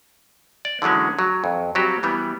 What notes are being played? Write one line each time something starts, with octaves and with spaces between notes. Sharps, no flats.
D5
D3 E3 F#3 G#3 C#4
F#3
F2
F#3 G3 C4 F#4 G4
E3 G3 B3